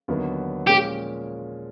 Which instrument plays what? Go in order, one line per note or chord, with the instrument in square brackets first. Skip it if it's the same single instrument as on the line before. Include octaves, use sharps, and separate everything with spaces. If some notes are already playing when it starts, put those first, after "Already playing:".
[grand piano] D#2 D3 F#3 B3 D#4
[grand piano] A#2 F3 G#3 C#4 [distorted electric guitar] G4